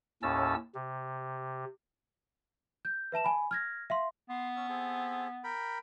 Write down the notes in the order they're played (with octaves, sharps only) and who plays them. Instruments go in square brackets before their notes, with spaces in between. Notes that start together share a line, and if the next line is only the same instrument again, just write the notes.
[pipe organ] D#2 A2 C#4 A5 E6
C3
[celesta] G6
B4 E5 A5 E7
G#5 B5
F6 G#6 A#6
E5 F5 C6
[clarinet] B3 [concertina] C6
[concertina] C#4 E6
C4 G#4 A4
A#4 G5 B5